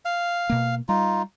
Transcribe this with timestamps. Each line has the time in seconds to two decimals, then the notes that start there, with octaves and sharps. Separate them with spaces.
0.05 F5
0.50 B2 A#3
0.89 G3 D#4 F4